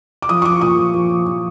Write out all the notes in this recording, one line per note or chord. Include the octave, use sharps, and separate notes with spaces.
D6
F3 D#6
C#6
F3 D6
A#2 D#6
F3
F3
F3
F3